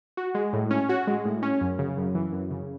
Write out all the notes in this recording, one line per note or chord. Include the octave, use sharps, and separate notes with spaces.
F#4
G#3
A2
C#4
F#4
G#3
A2
C#4
F#2
C#3
F#2
E3
F#2
C#3